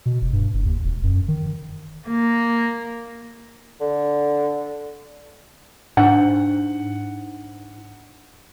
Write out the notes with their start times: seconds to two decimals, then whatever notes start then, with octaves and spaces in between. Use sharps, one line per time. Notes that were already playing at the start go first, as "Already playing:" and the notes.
0.06 B2
0.22 F1
0.33 G2
0.54 F#1
0.66 D#2
0.84 E1
1.03 F#2
1.28 D#3
2.08 A#3
3.81 D3
5.97 G#2 D4 F#5